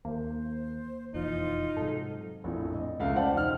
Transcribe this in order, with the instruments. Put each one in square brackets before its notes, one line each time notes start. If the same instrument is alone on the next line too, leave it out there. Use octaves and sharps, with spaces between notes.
[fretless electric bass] D#2 [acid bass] A#3 [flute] C5
[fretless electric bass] E1 F2 E3 [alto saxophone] D#4 [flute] F4
[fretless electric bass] G#2 C3 F#3 [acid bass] A4
[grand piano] A#1 F2 A2
D#5
C#2 A3 E5 F5
C5 D5 F#5 G5 A5
E1 D#4 F6